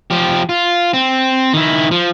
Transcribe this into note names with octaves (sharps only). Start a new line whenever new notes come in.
F3 G4
F4
C4
D#3 E4
F3